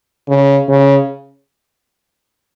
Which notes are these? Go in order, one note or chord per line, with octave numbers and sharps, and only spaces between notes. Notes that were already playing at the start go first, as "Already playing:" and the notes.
C#3
C#3